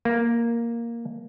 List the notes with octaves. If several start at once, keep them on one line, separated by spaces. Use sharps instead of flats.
A#3